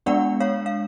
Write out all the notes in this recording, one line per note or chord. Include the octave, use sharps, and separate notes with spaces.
G#3 B3 D4 D5 F#5
C#5 F5
F5